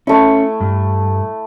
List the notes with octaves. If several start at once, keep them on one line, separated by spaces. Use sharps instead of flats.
A3 C#4 E4
G2